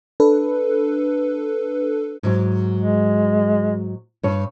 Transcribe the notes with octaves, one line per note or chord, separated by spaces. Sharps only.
D4 A4 B4
G#2 F#3
G#3
G2 C#5